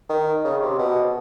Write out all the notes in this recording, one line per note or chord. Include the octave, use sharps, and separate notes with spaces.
D#3
C#3
C3
B2